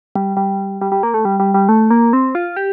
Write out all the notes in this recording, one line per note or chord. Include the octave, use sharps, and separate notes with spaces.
G3
G3
G3
G3
A#3
A3
G3
G3
G3
A3
A#3
C4
F4
G4